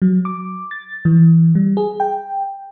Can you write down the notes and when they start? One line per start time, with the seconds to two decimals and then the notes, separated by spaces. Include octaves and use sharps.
0.02 F#3
0.25 D6
0.71 A6
1.05 E3
1.55 G3
1.77 G#4
2.00 G5